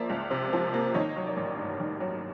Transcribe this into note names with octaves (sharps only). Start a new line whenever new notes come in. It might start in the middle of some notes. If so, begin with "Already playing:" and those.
Already playing: F3 A#3 D5 E5
C#2
C3
F3
A#3
D#3 C#5 D#5
F#3
D5
A1
G2
D#3
F#3